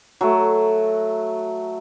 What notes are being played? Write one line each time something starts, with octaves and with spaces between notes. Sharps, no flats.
F#3 A3